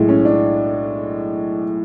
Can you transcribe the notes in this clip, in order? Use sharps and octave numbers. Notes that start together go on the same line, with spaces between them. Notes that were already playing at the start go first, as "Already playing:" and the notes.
Already playing: B1 A2 G#3
C#4
D4